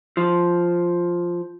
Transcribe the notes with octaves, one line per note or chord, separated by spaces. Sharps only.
F3